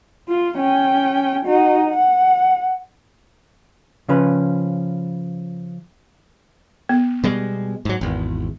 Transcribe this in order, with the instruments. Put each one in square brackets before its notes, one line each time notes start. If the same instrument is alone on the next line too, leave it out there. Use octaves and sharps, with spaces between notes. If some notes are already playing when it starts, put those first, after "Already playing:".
[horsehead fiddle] F4
C#4 G5
D#4 F#4
F#5
[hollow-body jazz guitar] C#3 F3 C#4 B4
[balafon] B3
[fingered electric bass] B2 G3 G#3
G#2 F#3
G#1 E2